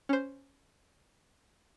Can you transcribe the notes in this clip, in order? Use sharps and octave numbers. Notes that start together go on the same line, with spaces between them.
C#4 C5